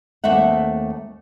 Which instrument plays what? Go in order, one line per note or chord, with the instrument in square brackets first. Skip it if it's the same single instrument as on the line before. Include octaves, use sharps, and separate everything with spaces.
[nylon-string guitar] D#2 A3 C4 E5 F#5